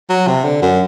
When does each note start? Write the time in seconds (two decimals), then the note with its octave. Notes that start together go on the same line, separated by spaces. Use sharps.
0.09 F#3
0.27 C3
0.44 D3
0.62 F#2